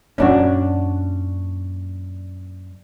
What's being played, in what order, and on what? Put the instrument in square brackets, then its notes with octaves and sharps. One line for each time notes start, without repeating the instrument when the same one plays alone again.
[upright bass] F#2 A#2 [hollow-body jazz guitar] C#4 D4 F#4